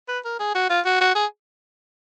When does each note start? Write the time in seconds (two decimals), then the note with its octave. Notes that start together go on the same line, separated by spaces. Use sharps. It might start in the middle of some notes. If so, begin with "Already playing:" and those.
0.08 B4
0.25 A#4
0.40 G#4
0.55 F#4
0.70 F4
0.85 F#4
1.01 F#4
1.15 G#4